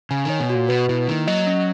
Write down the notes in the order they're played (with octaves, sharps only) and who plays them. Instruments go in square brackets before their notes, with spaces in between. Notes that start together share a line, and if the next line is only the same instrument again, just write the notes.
[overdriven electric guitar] C#3 [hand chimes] G#5
[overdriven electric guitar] D#3 [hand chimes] C#5
[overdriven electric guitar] B2
[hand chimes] F#4
[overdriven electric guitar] A#2
[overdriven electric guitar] B2 [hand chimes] B4
[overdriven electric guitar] B2 [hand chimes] E4
[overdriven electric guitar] D#3 [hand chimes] A#3
[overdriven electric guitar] F#3 [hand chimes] D#5
[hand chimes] C#4